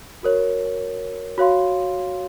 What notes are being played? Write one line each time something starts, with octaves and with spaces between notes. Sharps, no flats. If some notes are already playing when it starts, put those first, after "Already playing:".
F#4 A#4 C#5
F#4 C#5 F5 C6